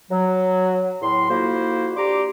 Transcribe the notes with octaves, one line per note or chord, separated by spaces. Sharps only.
F#3
E2 A2 C6
F2 A#3 E4 F#4 C5
D4 G4 A#5 C6 D6